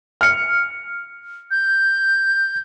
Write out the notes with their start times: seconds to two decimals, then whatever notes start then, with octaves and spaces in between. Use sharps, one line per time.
0.21 F6 C#7
1.51 G6